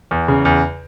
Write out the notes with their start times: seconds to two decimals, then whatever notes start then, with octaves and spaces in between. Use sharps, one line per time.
0.11 E2
0.28 C#3
0.45 E2